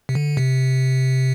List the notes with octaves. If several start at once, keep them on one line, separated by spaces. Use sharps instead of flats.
C3
D3
C3